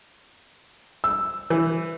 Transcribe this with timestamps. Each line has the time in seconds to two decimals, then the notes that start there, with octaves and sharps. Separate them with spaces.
1.04 E6
1.50 E3